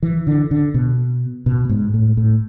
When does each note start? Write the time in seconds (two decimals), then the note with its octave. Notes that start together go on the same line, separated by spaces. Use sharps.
0.03 E3
0.27 D3
0.51 D3
0.74 B2
1.46 B2
1.69 G#2
1.94 A2
2.17 A2